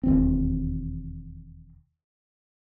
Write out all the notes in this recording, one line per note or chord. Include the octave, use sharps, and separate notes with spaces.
E1 D#2 C4